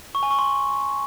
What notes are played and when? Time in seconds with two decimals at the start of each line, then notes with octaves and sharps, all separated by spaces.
0.15 C#6
0.23 G#5
0.31 C#6
0.39 C6